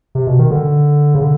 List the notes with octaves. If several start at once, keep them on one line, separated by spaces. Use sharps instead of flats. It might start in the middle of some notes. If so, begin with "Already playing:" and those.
C3
B2
D#3
D3
C#3
D3